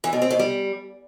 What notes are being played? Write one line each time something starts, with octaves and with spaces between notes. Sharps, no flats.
E3
B2
C4
B2
G3